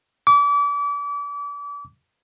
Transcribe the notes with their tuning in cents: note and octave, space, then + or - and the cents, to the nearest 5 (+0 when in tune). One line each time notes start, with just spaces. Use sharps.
D6 -35